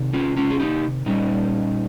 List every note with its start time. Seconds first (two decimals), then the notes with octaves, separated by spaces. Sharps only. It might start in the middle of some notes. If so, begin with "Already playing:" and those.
Already playing: C3 D#3
0.13 C#4 F4
0.37 C#4 F4
0.51 G#4
0.60 D#4 G4
1.06 A#2 G3 C#4 D#4